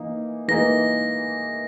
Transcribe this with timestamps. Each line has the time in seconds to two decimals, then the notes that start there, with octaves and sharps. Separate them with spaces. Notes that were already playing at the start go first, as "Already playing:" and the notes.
Already playing: E3 A#3 D#4
0.48 E3 A#3 D#4 A#6